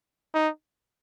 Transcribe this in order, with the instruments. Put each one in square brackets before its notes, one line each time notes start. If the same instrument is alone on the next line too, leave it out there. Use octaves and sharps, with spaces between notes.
[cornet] D#4